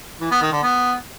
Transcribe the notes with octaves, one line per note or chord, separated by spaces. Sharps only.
E3
B3
D#3
D3
B3